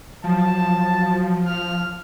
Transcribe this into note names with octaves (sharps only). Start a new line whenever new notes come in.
F3 F#3 A5
F6